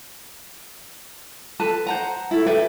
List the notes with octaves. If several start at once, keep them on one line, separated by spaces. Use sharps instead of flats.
A4 B4 A5
C5 F#5 A#5
E4 A4
G4 A4 B4 E5